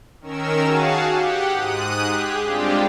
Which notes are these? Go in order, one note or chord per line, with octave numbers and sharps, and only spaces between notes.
D#3 C#4 A#4 E6
F#4 G#4 F5 A5
G4 F#5
G#2 D#6 F#6
G4 G#4
G3 G#3 C4 D4 F4 G4